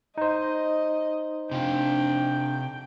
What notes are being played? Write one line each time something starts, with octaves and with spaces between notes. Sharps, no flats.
D#4 C5 D#5
C3 D4 F4 G5